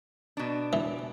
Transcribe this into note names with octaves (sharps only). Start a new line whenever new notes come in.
B2 D4
E3